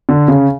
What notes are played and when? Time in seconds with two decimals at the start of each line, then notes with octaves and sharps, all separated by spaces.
0.09 D3
0.28 C#3